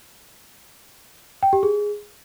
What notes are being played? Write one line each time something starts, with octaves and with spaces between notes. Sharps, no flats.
G5
G4
G#4